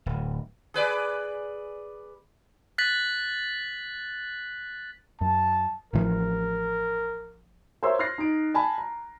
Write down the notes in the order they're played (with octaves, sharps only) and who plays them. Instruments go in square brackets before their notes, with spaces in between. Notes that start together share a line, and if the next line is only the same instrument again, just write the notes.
[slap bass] D1
[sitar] G#4 B4 D5
[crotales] F#6 A6 B6 F#7
[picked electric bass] F#2 [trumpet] A5
[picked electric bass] A1 E3 F3 [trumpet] A#4
[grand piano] A#4 C5 C#5 E5 C6 E6
C6 F6 F#6 A6 A#6 C7
D#4 D7
G#5 A5 B5
A#5